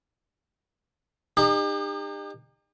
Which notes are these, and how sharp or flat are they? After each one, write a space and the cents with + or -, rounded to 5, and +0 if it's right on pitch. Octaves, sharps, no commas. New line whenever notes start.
D#4 -40 G4 +40